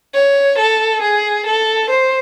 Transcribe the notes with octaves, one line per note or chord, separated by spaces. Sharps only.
C#5
A4
G#4
A4
C5